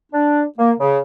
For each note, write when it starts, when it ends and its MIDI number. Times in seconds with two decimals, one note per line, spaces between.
0.12 0.44 62
0.59 0.72 58
0.79 1.00 49